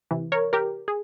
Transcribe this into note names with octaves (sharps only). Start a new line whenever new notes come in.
C3 E3
A#4 C#5
G4 A#4
G#4